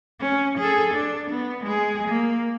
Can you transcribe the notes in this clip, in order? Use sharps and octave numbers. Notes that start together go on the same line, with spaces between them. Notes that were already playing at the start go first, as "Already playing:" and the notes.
C#4
G#4 A4
D4
B3
G#3 G#4
A#3